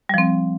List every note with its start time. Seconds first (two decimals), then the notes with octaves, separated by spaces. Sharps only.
0.09 G3
0.14 F3
0.18 C4